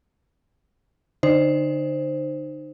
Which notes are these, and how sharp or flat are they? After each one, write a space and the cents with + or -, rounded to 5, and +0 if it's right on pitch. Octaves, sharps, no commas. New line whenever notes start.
D3 -15 D#4 -25 C5 +0